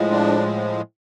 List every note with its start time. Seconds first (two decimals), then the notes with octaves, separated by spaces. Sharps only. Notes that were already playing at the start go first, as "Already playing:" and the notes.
Already playing: A2 F3 G#3
0.11 D4